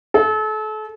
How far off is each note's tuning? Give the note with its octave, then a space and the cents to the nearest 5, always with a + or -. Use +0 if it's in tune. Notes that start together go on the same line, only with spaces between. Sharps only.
A4 -35